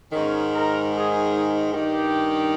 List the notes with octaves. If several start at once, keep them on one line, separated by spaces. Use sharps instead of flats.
G#2 D#3 C#4
A#4
G#4
G2 D#3 G4